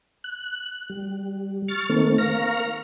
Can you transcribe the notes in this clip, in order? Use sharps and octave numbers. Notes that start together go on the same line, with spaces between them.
F#6
G3
C#6 F6 A6
D#3 A3 A#3 C4
A#4 F5 C#6 F6 A#6